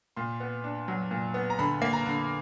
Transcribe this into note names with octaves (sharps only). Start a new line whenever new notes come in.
A#2 C6
B3
D4
F#3
A#2
B3
A#5
D3 B5
A#3
A#5
D3